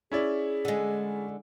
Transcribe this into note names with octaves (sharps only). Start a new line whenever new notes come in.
C#4 E4 G#4 D5
D3 G#3